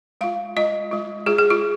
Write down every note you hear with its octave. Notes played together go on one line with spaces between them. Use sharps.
G#3 F4 F5
G#3 F4 D#5
G#3 F4
G#3 F4 G#4
G#4
F4